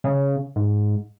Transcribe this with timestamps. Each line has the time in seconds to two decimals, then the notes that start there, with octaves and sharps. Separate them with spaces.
0.04 C#3
0.56 G#2